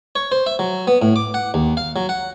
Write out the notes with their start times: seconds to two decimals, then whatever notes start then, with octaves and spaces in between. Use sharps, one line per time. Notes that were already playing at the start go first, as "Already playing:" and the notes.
0.16 C#5
0.32 C5
0.47 E5
0.59 F#3
0.87 B3
1.02 A2
1.16 D6
1.34 F#5
1.54 D#2
1.77 F5
1.96 F#3
2.09 F#5